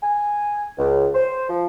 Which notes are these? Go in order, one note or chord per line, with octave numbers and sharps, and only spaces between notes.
G#5
C#2
C5
F3